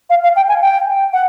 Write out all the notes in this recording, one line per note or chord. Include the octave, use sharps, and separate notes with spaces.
F5
F5
G5
G#5
G5
F#5